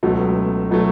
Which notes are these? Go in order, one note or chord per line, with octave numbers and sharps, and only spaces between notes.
C#2 B2 F#3 A3
B2 F#3 A3